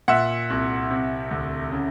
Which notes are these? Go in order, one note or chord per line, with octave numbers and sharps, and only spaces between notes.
A#2 E5 F#5
C2
C3
D2
C#3